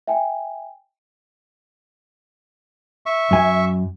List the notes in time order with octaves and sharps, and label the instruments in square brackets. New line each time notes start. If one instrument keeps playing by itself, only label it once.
[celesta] E5 G5 G#5
[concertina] E5 C#6
[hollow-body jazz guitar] F#2 G#5